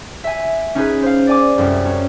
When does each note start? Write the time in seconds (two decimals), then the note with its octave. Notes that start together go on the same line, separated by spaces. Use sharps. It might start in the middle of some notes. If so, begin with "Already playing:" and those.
0.24 E5 G#5
0.75 C#4 D#4 G#4 B4
1.03 C5 F5
1.27 D5 G#5 D6
1.58 C2 F#2
1.85 C#4